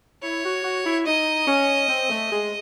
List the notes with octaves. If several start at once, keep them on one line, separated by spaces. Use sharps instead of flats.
E4 C#5
F#4
F#4
E4
D#4 D#5
C#4
C4
A3
G#3